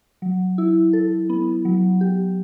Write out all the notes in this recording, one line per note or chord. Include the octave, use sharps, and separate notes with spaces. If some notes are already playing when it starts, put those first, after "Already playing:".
F#3
E4
A4
B3
F#3
G4